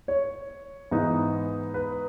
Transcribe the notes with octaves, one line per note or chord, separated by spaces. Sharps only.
C#5
G#2 E3 B3 D#4
B4